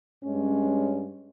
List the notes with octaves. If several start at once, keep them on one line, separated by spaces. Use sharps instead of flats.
G2 G#3 C#4